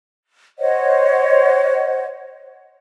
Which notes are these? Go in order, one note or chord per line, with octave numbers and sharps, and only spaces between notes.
C5 C#5 D#5 F#5